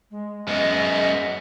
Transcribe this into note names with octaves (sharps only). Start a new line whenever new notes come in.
G#3
F#2 G#3 B3 D#5